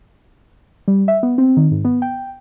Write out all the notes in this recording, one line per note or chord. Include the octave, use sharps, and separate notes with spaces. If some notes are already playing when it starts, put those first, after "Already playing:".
G3
E5
B3
C4
D#3
G#2
B3
G5